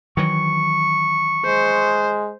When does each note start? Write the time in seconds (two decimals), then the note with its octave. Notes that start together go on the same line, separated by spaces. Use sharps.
0.17 D#3 E3 F#3 C#6
1.46 G#3 C5